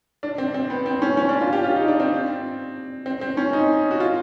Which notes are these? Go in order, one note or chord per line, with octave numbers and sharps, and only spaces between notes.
D4
C4
C4
B3
C4
C#4
C#4
D4
F4
G4
F4
D#4
D4
C4
C4
C4
C#4
D#4
F#4
F4